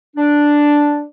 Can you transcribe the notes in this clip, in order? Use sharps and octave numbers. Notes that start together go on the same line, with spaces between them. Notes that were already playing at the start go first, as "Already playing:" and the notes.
D4